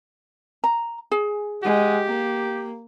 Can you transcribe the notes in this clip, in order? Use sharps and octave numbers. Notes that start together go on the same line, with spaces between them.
A#5
G#4
G#3 G4 F#5
A#3